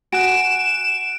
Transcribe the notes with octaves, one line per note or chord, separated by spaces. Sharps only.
F#4 G#5 C#6 F#6 D7 E7